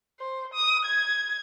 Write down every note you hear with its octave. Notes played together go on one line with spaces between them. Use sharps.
C5
D#6
G#6